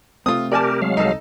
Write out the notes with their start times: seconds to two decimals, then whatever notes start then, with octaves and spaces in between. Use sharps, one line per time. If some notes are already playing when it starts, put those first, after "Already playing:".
0.26 C3 A3 C4 F4 D#6
0.52 G4 A#4 D5 G#5 A5
0.82 F#3 G#3 F5
0.97 C2 D#4 A4 A5